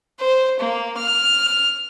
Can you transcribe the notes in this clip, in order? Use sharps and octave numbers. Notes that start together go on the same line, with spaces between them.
C5
A#3
F6